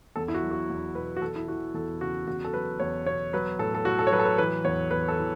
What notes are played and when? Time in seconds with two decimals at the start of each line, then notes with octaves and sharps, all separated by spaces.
0.16 E2 A4
0.28 E4
0.34 F#4
0.43 F#3
0.51 F#4
0.70 E2
0.95 B2 B4
1.17 F#4
1.21 E2 A4
1.36 E4
1.48 E3 F#4
1.74 E2 A4
2.00 C#3 F#4
2.27 E2 F#4
2.45 A4
2.53 F#3 B4
2.80 E2 C#5
3.06 B2 C#5
3.33 F#3 B4
3.59 A2 A4
3.75 A4
3.85 A2 F#4
3.99 A4
4.07 C#5
4.12 F#3 B4
4.19 A4
4.25 B4
4.38 E3 B4
4.64 E2 C#5
4.91 E2 B4
5.08 A4
5.18 E3